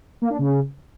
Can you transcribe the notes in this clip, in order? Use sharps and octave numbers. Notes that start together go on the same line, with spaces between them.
A#3
D4
C#3